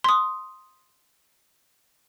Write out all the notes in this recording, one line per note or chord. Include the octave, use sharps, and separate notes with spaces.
C6 D#6